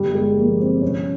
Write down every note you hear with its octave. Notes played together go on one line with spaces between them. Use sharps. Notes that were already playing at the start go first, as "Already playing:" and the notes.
Already playing: G1 G3
G#3
F3 A#3
C4
C2 C#4